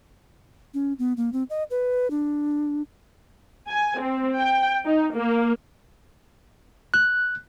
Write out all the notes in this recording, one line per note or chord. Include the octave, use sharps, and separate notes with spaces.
C#4
B3
A#3
C4
D#5
B4
D4
G#5
C4
G5
D#4
A#3
F#6